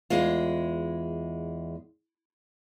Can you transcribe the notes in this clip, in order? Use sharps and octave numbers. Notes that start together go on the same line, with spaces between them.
E2 G#3 F4